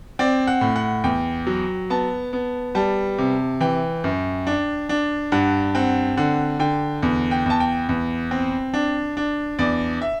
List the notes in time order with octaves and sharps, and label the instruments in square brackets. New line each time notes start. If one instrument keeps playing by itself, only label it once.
[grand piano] C4 D5
F#5
A2
F#5
E2 G5
F#3
B3 A5
B3
G3 A5
C3
E3 G5
F#2
D4
D4
G2 F#5
C4 F#5
D3 F#5
D3 G5
E2
G5
E2 A5
G5
E2
C4
D4
D4
E2 D5
E5